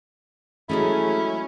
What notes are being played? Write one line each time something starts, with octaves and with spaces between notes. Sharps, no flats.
F#3 G#3 A3 C#4 E4